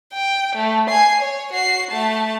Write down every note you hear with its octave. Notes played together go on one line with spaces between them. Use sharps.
G5
A3
G#5 C7
C#5
F#4 C7
A3 A5